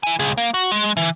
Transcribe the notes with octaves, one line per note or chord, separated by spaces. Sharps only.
E4 G#5
C#2 G#4
A#3
F#4
G#3
E3